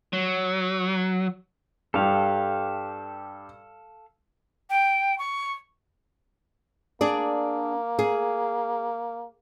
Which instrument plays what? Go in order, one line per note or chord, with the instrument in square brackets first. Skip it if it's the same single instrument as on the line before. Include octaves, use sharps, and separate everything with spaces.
[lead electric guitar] F#3
[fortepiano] G2 G4 [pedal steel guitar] A4 F5
[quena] G5
C#6
[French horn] A#3 [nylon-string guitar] D4 G#4 D5
[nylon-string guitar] G#4